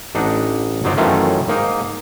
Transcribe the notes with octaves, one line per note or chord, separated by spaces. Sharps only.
A1 D4 D#4 F#5
G1 F#3 D#4 C5 D5
F#2 D#3 E3 A3 C#4 F4
G#2 A#3 D#4